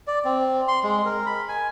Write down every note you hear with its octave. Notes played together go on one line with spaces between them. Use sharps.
D5
C4
C6
G#3
A#4
B5
G#5